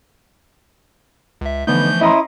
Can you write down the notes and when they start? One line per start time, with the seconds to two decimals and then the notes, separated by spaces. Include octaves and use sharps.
1.41 C#2 E5
1.67 D3 E3 F3 A3 B3 D#4 G6
2.01 C#4 E4 D#5 A#5 C6 D#6